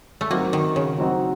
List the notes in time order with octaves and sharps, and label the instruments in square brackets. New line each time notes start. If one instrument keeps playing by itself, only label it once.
[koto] A3
[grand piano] F#3 C4 D#4 F#4 [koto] A#3
[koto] D#3
C#3
[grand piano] F#3 C4 D#4 F#4